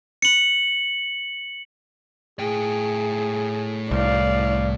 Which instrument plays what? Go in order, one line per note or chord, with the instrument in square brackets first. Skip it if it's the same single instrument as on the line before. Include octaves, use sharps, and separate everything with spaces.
[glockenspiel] C#7 F#7
[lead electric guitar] A2 G5 [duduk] G#4
[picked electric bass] C2 [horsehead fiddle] D5 F5